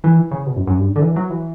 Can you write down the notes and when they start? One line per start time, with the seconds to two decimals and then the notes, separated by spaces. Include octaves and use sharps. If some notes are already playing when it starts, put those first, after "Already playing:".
0.04 E3
0.31 C#3
0.46 B2
0.56 F#2
0.67 F#2
0.78 G2
0.96 D3
1.02 E3
1.16 F#3
1.30 E3